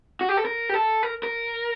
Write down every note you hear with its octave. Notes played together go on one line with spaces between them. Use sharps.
F#4
G4
A4
A#4
G4
A4
A#4
A#4